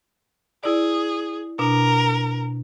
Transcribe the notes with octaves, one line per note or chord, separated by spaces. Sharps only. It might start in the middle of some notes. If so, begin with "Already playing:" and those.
E4 G#4 D5
B2 D4 A#4